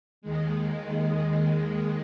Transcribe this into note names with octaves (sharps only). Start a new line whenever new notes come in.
D#2 D#3 G#3